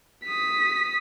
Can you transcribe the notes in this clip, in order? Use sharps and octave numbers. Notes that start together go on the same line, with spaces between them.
D#6 B6